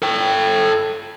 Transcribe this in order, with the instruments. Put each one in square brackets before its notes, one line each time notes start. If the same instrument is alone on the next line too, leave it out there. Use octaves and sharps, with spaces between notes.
[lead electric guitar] A4 G5